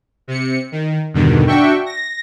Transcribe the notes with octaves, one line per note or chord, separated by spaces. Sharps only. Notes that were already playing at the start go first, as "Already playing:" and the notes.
C3 C#7
D#3
E2 G2 B2 D3 D#3
D4 F#4 E5 G5 C#6
A#6